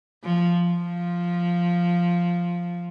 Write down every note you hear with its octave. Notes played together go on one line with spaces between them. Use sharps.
F3
F3